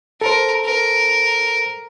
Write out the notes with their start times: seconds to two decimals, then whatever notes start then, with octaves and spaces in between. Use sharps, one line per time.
0.21 A4 A#4 C5
0.65 A#4